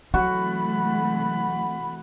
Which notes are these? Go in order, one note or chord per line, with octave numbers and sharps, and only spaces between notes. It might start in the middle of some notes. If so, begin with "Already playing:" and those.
C3 E3 F#3 A3 F#4 B5